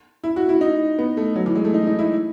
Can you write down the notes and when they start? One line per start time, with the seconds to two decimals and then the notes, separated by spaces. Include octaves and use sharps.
0.24 E4
0.36 F#4
0.49 E4
0.61 D#4
0.98 B3
1.17 A3
1.36 F#3
1.46 E3
1.55 G#3
1.64 A3
1.74 D#4
1.87 D#4
1.99 E4